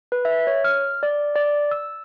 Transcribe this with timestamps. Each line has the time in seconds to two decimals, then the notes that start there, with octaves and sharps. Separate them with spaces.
0.12 B4
0.25 E5
0.47 C#5
0.64 F6
1.03 D5
1.36 D5
1.71 E6